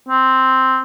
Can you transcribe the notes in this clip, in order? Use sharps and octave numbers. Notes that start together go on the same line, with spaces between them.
C4